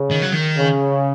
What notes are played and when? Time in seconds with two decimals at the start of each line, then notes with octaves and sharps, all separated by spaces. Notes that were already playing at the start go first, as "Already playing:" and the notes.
Already playing: C#3
0.11 D#3
0.22 F#3
0.32 D#3
0.57 C#3